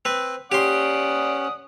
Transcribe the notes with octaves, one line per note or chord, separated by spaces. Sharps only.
C4 B4
C#4 G4 D5 F#5 C6 D#6